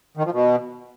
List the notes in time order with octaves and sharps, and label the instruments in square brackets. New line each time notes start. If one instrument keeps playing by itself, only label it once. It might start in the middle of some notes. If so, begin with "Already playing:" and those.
[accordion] D#3
F3
B2